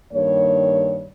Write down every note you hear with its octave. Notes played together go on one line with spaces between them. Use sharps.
G2 D#3 A#3 C#5